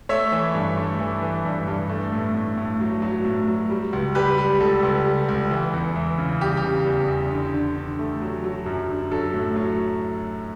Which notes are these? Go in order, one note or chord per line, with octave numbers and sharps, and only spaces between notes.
A3 C#5 E5
E3
G2
A3
E3
E3
G2
G2
A3
A2
A2
A2
F#3
F#3
A2
F#3
G3
C#2
G3 G4 B4
G3
C#2 A4
C#2
G3
C#2
E3
E2
E3
C#3
G3 G4
G4
C#3
E2
E2
D3
D3
D3
A3
F#3
F#3
F#2
D3
F#3 A4
A2
F#3